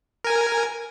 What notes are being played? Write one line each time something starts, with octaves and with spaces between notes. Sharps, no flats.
A#4 G#5